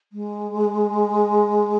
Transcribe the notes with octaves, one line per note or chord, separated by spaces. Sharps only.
G#3